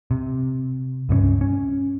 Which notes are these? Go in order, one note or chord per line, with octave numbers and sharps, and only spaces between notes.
C3
C#2 G2 A3 C#4
C#4